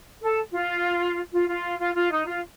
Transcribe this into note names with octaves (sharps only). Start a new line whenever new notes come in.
A4
F4
F4
F4
F4
F4
D#4
F4